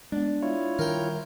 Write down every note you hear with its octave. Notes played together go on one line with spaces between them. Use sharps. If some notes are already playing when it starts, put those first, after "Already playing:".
G#3 B3 D4
E4 F4 C#5
D#3 G3 A#4 G5